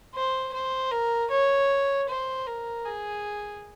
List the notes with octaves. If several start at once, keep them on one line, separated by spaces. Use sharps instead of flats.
C5
C5
A#4
C#5
C5
A#4
G#4